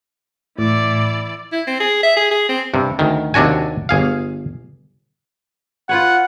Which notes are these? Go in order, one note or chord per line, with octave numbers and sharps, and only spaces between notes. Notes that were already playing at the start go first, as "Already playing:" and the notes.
A2 E3 D5
E4
C4
G#4
E5
G#4
G#4
C4
G2 C3
D2 D#3
D#2 C3 D4 F#4 G#5
G1 G#4 F5
F4 B4 C#5 F#5